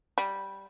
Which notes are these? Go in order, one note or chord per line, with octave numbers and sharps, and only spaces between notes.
G3